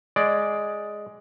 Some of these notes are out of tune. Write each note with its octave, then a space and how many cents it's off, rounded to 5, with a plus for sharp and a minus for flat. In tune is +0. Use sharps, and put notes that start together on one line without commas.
G#3 +0 D5 +0